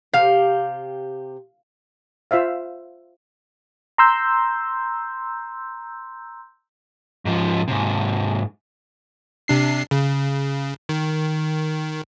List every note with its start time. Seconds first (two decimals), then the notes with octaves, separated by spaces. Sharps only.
0.13 C3 G4 F5
2.31 F4 C5 E5 F5
3.98 A#5 C6 E6 G6
7.25 G#2 F3
7.68 G#2 C3
9.48 C3 D4 C7
9.91 C#3
10.89 D#3